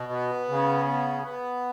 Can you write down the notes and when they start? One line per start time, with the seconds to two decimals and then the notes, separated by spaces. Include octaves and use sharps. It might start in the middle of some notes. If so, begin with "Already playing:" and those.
Already playing: B2
0.12 B3
0.49 C#3
0.85 B3
1.23 B3